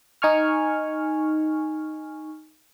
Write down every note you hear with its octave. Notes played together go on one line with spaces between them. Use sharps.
D#4 G#5 C#6 F6